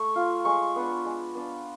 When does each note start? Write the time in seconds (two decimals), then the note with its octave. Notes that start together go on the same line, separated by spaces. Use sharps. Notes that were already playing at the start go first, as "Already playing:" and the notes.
Already playing: A3 C#6
0.15 F4
0.45 G#3 C#6
0.76 B3 D4
1.05 G#3
1.35 B3 D4